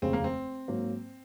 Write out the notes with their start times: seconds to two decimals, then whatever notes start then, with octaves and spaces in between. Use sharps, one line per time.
0.02 F1 D#2 C#3 G#3 C4
0.13 A#3
0.24 C4
0.68 G#2 F#3 A#3